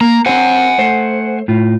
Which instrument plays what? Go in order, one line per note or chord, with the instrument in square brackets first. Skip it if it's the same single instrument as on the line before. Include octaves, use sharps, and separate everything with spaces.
[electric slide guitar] A#3 [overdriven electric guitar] A#5
[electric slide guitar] C4 C5 [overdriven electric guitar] F#5 G#5
[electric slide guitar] A3 C5
A2 F4